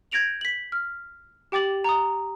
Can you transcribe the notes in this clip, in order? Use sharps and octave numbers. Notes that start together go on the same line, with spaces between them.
G6 G#6 A#6 D7 F7 F#7
B6 F#7
F6
G4 G5 D6 A6 F#7
A#5 D#6